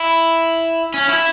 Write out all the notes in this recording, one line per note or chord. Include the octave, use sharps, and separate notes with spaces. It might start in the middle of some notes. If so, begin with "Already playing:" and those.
Already playing: E4
C#4
E4